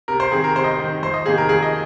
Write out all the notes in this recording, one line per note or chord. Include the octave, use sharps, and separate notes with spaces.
C3 A#4
C5
D#3 C4 G#4
A#4
C3 C5
D#5
C5
D#3 C4
F2 C5
D#5
C3 D#3 A#3 G#4
A#4
F2 G#4
D#5